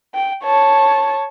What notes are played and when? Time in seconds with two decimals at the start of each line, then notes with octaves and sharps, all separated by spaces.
0.15 G5
0.44 C#5 A5